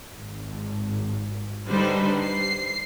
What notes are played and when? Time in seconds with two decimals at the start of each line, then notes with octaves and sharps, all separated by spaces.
0.14 G#1
1.68 D3 G3 D4 D#4 B4 C5
2.23 C7